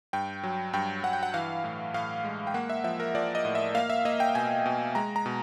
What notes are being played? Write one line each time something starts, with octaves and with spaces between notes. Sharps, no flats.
G2 G5
F#3
G2 G5
G2 F#5
G5
F#5
E3 F5
A2
A2 F5
G#3
G5
A#3 F#5
E5
F3 E5
A#4
F3 D5
D#5
A2
E5
A#3 F5
E5
A#3 D#5
G5
B2 G#5
B2
G#3 A#5
A#5
B2